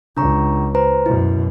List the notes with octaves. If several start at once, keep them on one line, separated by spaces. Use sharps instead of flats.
C#2 D4 A#5 C#6
B4 C5 A#5
F#2 B2 E4